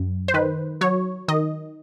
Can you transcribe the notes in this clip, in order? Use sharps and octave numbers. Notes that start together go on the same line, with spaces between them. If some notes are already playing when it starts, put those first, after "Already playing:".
Already playing: F#2
C5
D#3 B4
F#3 C#5
D#3 D#5